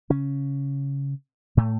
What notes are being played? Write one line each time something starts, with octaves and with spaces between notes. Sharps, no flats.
C#3 C#4
A2 A3